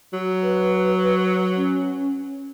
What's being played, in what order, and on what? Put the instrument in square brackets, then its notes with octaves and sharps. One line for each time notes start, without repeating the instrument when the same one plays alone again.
[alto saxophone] F#3
[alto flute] B4
C#4